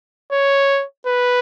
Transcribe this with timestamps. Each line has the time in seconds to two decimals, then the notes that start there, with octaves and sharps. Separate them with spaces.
0.32 C#5
1.07 B4